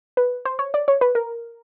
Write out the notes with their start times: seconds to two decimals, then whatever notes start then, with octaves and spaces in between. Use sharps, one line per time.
0.17 B4
0.45 C5
0.59 C#5
0.74 D5
0.88 C#5
1.01 B4
1.15 A#4